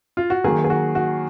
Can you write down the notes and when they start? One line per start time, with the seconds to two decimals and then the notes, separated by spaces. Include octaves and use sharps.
0.17 F4
0.30 F#4
0.44 D#3 F#3 A#3 G#4
0.64 G#4
0.70 F#4
0.95 F#4